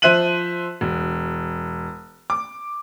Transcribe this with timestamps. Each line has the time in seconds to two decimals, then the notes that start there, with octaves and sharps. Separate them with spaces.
0.02 F3 C5 E5 F#6 D#7 F#7
0.81 E1
2.30 D6